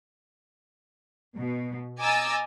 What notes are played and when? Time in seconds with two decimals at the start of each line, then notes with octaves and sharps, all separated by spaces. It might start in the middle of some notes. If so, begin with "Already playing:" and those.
1.36 B2
2.00 D#5 G#5 A#5 D6 E6 A6